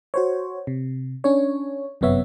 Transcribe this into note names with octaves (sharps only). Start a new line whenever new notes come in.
F#4 C5 C#5
C3
C#4 D4 C#5
G1 F#2 C3 B3 C#5 E5